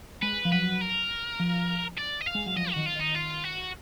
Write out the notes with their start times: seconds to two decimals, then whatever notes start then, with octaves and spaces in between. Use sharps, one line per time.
0.22 G#3 B4
0.45 F3
0.52 F#3 B4
0.81 A#4
1.40 F3
1.98 D5
2.21 D#5
2.27 F5
2.35 G#3
2.46 F#3
2.56 F3 D#5
2.71 D#3 F#4
2.86 F4
2.96 D#3 D#4
3.15 F4
3.44 F#4